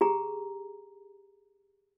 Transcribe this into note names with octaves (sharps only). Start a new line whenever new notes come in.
G4 G#4 A#5